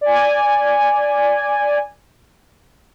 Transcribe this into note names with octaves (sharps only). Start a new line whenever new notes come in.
D5 G#5